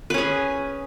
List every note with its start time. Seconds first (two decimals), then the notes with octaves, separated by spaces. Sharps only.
0.10 B4
0.14 C#4
0.18 G#4